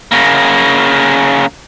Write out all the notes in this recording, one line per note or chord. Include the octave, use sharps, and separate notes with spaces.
C#3 A#3